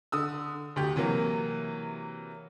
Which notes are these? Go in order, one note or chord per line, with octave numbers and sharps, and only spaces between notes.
D3 D#6 E6
D2 G4
C3 E3 F#3 A#3